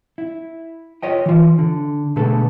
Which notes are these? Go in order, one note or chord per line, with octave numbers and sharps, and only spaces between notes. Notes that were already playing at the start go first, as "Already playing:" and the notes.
E4
F4 C#5 D#5 G5
E3 F4
D3
B2 D3 G#3 A3 B3 A4